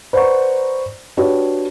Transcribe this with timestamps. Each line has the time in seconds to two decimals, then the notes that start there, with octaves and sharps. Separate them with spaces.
0.13 B4 C5 D5 F#5 A#5 C#6
1.17 D4 F#4 G4 B4 C#5 D5